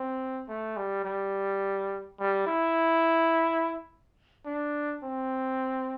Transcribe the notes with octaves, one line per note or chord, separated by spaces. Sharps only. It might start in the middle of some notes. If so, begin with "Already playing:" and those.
Already playing: C4
A3
G3
G3
G3
E4
D4
C4